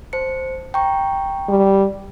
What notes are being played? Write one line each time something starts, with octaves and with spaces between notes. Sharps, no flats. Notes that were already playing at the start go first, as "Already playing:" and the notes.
C5 A5 C#7
G5 A#5 C#6
G3